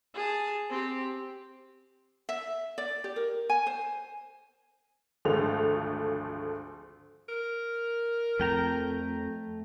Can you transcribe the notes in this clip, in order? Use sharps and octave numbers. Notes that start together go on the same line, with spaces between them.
G#4 A5
C4 G4
E5
D5
G4
A#4
G#5
C5
G#1 D2 F3 G#3 A3 F7
A#4
F2 A3 G5 A#5